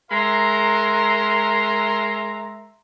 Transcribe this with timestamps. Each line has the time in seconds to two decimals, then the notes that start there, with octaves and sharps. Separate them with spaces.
0.11 G#3 A#4 E5 A#5 C6